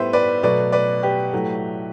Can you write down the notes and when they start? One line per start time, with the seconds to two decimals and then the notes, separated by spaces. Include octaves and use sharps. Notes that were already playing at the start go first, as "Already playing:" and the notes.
Already playing: A2 G3 B3 B4 C5 E5
0.13 B4 D5
0.43 B2 F#3 A3 B4 D5
0.72 B4 D5
1.03 G4 B4
1.33 A2 F#3 A3